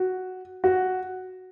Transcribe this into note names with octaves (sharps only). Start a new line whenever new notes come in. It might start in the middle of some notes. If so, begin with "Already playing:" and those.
Already playing: F#4
F#4